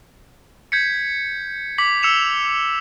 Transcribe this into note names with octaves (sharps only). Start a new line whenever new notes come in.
G6 G#6 B6 C#7
D6 B6 F#7
E6 C#7 E7 F7